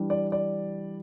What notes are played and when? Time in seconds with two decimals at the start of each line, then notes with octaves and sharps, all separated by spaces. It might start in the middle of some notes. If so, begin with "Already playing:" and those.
Already playing: E3 G3 D4
0.10 D5
0.32 D5